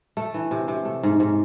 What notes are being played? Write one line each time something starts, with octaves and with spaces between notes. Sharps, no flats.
A3
E3
C3
C3
A3
G#2
G#2